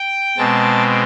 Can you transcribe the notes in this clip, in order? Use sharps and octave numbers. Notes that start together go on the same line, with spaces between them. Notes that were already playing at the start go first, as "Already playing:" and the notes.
Already playing: G5
B2 G#3 C4 A5